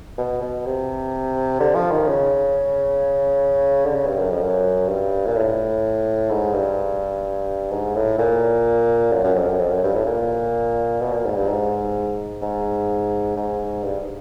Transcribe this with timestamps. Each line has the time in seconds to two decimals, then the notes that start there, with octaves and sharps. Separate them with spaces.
0.18 B2
0.42 B2
0.66 C3
1.60 D3
1.75 F3
1.91 D#3
2.07 C#3
3.86 D3
3.95 C#3
4.07 G2
4.19 F#2
4.31 F2
4.42 F#2
4.89 G2
5.26 A#2
5.36 A2
6.31 G#2
6.54 G2
7.71 G#2
7.96 A2
8.19 A#2
9.13 F#2
9.24 F#2
9.36 F2
9.49 F#2
9.60 F2
9.71 F#2
9.84 G2
9.95 A2
10.07 A#2
11.01 B2
11.12 A#2
11.25 G#2
11.37 G2
11.48 G#2
12.42 G#2
13.37 G#2
13.83 G2